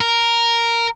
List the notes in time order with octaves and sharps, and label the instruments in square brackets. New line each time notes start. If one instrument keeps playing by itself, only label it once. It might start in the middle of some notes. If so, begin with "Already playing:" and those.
[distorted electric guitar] A#4